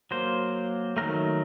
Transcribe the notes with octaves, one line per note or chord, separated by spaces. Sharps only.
F#3 A#3 C5
D#3 F#3 A3 A#4